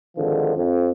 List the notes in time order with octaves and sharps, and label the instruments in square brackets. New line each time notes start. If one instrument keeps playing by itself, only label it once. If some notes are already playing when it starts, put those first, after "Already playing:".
[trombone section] G#1 D3 D#3 F3
F2